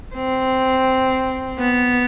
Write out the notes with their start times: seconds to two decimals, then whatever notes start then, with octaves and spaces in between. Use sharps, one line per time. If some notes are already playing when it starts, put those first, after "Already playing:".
0.15 C4
1.59 B3